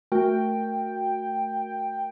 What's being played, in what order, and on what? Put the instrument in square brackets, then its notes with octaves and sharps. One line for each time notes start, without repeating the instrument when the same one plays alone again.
[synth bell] A3 F#4 A#4 [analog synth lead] G5